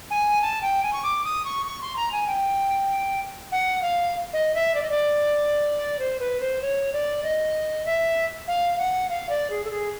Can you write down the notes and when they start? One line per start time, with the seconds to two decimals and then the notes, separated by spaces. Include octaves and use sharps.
0.11 G#5
0.42 A5
0.62 G5
0.83 G#5
0.93 C#6
1.03 D6
1.24 D#6
1.45 C#6
1.66 C#6
1.81 C6
1.96 A#5
2.12 G#5
2.27 G5
3.52 F#5
3.82 F5
4.33 D#5
4.55 E5
4.75 D5
4.83 D#5
4.90 D5
5.99 C5
6.20 B4
6.40 C5
6.62 C#5
6.93 D5
7.23 D#5
7.86 E5
8.48 F5
8.78 F#5
9.09 F5
9.29 D5
9.50 G#4
9.64 A4
9.71 G#4